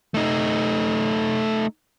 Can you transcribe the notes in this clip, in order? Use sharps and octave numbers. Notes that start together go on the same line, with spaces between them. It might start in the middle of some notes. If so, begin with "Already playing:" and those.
A3 D#4